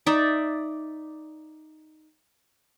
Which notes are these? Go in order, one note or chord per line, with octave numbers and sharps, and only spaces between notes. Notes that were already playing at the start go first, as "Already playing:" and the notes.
D#4 D5 E5